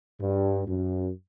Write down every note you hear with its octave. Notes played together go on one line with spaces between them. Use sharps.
G2
F#2